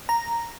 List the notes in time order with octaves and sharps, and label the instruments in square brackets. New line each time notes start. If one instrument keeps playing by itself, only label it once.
[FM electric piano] A#5